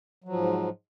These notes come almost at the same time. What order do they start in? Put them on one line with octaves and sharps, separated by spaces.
F#3 F3 G#2